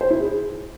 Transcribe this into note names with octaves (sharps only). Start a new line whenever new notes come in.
C5
E4
G#4